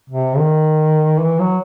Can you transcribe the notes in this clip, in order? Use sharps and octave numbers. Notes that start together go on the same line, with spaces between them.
C3
D#3
E3
F#3